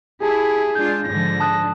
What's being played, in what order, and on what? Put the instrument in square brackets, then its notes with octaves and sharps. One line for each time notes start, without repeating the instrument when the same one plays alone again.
[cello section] E4 [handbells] G4 A5 [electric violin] G#4
[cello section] G#3 D4 F4 [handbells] G6
[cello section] G#2 D3 F3 [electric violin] A#6
[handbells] A5 D#6 F#6